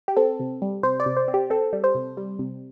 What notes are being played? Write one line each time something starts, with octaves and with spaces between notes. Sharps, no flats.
G4
C4 A4
C3
G3
C3 C5
D5
C3
C5
C4
G4
C4 A4
G3
C5
C3
G3
C3